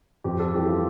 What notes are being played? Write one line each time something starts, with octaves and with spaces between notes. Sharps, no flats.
F2 G4
A4
E3 G3 G4
F4